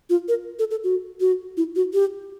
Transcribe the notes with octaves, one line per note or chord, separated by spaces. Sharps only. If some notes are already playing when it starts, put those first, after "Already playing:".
F4
A#4
A4
A4
F#4
F#4
E4
F#4
G4